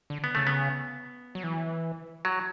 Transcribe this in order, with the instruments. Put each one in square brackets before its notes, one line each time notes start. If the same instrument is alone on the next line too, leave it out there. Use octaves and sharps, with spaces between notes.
[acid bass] D3
[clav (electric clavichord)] B3
[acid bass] C#3 [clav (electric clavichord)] A3
[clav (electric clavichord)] B3
[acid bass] F#3
E3
[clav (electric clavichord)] F#3